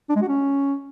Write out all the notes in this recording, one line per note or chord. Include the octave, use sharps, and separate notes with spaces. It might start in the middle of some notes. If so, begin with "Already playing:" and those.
D4
G#3
F#4
C#4